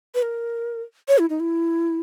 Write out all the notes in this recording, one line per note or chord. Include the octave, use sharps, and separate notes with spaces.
B4
A#4
C#5
E4
D#4
E4